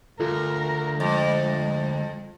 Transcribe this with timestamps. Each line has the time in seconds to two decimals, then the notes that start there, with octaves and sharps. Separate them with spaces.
0.20 D2 F4 A4 A#4
1.00 F2 G#3